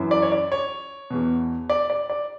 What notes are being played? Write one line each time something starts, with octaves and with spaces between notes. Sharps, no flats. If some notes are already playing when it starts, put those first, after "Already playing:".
Already playing: F#2 E3
D5
C#5
D5
C#5
E2 B2
D5
D5
D5